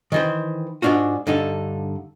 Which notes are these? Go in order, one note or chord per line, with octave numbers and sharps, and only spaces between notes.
D#3 E3 C5
G#2 D3 D4 F4 F#4
G2 D3 D#4 A4